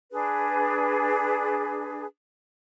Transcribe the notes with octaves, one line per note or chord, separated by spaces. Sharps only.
D4 G#4 B4